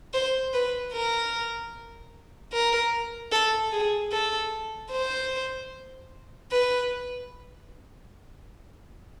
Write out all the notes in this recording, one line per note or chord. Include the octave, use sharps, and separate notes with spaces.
C5
B4
A#4
A#4
A4
G#4
A4
C5
B4